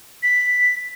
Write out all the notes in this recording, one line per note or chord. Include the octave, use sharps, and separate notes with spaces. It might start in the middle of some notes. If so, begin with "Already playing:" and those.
B6